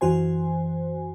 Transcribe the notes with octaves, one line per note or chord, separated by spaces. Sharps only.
F#2 E3 F#4 C5 G#5